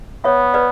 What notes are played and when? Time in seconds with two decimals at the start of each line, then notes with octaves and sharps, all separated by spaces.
0.24 B3 C#5 E5
0.54 B4 D5